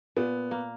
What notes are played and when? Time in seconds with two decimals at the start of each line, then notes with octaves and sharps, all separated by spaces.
0.16 A#2 B3
0.51 A#3